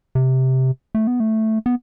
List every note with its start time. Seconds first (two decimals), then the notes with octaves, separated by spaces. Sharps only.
0.15 C3
0.95 A3
1.07 B3
1.20 A3
1.66 B3